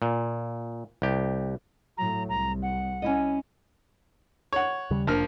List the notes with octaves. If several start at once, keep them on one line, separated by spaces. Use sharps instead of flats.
A#2
C2 G4
A2 F#3 A#5
C2 A#5
F#5
C#4 E4 D#5
C#5 F#5
D#2 C#3 G3
F1 F3 A#3 D4 F6